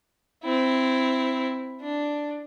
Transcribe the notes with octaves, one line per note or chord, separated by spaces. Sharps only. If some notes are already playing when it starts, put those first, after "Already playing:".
C4 E4
D4